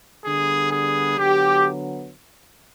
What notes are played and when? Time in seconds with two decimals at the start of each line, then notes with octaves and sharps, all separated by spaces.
0.23 D3 G3 B3 G#4
0.71 G#4
1.18 D3 F#3 B3 G4